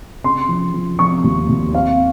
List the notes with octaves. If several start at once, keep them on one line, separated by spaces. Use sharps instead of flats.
C#3 C6
F3
F3
F3 C#6
D#2
D#2
C4 F5